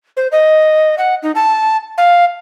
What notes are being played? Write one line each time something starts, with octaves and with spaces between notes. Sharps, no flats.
C5
D#5
F#5
D#4
A5
F5